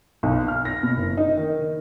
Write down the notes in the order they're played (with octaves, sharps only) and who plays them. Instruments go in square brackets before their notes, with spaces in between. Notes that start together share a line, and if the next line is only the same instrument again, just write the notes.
[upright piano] B1
F6
A#6
B2
F#1
D#4
D#3